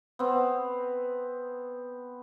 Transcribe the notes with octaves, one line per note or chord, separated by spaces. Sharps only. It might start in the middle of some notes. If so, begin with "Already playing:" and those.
B3 C4